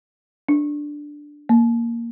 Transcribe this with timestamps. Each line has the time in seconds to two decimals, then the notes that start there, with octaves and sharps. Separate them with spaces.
0.49 D4
1.49 A#3